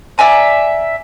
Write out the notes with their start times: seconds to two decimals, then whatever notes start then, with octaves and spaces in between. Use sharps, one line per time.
0.18 D5 E5 G#5 A#5